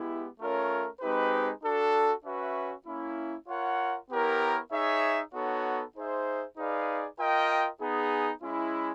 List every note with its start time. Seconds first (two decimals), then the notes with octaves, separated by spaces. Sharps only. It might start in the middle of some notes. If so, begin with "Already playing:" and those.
Already playing: G#3 B3 E4 G4
0.39 A3 C#4 F4 A#4 C#5
1.01 G#3 C4 D#4 G4 B4
1.63 D4 F#4 A4
2.25 C#4 F#4 B4 E5
2.87 A#3 C#4 E4
3.48 F4 A#4 C#5 F#5
4.10 B3 E4 G4 A#4 C#5
4.72 D#4 G#4 C#5 E5
5.34 B3 D#4 F#4 A4 C#5
5.95 D#4 G#4 C5 E5
6.57 D#4 G#4 B4 D5 F5
7.19 F4 A#4 D#5 G5
7.81 B3 D#4 G#4
8.42 G#3 C#4 E4